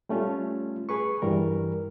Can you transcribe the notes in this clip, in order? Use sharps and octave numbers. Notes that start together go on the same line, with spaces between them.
G3 A3 C#4 F4
G#4 B4 C#6
G2 E3 G3 A#4